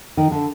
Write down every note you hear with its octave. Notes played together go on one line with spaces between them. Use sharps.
D#3
D3